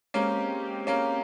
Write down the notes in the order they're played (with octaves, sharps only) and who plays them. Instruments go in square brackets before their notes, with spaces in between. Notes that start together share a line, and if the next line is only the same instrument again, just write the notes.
[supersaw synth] G#3 C4 G4 [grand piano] A#3 C#4
[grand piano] A#3 C#4